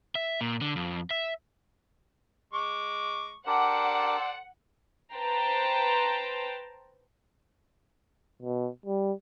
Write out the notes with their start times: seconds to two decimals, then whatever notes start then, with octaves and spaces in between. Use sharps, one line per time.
0.15 E5
0.41 A#2
0.61 D3
0.76 F2
1.11 E5
2.53 G#3 C#6 D6
3.47 D4 G4 A4 A#4 C5 D5 F#5
5.15 B4 C5 G5 A5 A#5 C6
8.42 B2
8.86 G3